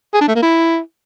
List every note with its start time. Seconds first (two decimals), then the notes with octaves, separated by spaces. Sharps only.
0.14 G#4
0.21 D4
0.28 A3
0.35 A#3
0.42 E4